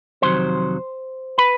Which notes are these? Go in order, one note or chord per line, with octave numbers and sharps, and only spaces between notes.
F2 C3 D#3 F#3 C5 C6
B4 B5